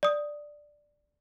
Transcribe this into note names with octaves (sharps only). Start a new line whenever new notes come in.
D5 D#6